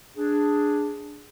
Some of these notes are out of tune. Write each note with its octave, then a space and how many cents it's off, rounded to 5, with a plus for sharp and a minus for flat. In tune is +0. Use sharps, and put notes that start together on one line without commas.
D4 +0 G#4 +0